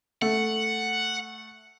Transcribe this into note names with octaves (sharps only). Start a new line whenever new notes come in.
A3 F#5